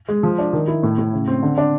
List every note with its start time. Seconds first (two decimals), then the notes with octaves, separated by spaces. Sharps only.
0.08 G#3
0.23 F3
0.39 D4
0.53 D#3
0.68 E4
0.83 A2
0.98 A2
1.13 C#3
1.28 C4
1.43 D3
1.58 D4